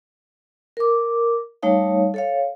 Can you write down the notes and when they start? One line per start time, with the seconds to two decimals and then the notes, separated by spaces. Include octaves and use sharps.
0.77 A#4 D6
1.63 G3 A3 D#4 C#5 F5
2.14 A4 C#5 F5